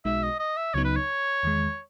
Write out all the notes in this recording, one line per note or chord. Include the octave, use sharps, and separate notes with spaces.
B1 B2 G#3 D#4 F#4 E5
D#5
D#5
E5
C#2 C#3 F#3 B3 D#4 C#5
B4
C#5
E2 D#3 G#3